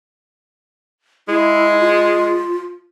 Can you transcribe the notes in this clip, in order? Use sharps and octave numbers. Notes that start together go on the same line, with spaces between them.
G#3 E4
F4